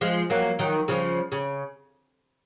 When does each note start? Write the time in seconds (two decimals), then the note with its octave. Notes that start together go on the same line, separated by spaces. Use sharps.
0.01 F3 G#3
0.30 F#3 A#3
0.59 D#3 F#3
0.88 C#3 F3
1.32 C#3